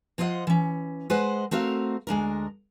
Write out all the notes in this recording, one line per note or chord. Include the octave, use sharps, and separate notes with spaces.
F3 F4 C5 D#5 F#5
E3 C#4
G#3 B4 C5 D#5 F#5
A3 C4 F#4 A#4 F5
D2 G#3 D4 A#4